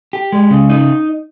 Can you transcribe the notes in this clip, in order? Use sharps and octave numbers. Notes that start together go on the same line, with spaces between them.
G4
G#3
C#3
D#4